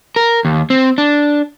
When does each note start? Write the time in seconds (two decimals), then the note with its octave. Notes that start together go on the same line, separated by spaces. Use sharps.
0.16 A#4
0.45 D#2
0.70 C4
0.98 D4